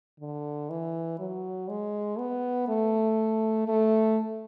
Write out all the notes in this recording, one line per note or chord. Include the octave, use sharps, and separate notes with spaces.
D3
E3
F#3
G#3
B3
A3
A3